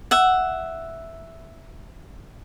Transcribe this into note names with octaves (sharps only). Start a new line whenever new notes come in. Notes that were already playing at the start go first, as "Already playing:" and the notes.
E5 F#5